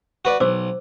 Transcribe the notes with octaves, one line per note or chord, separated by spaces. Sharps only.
F#4 B4 D5
B1 C5 D6 E6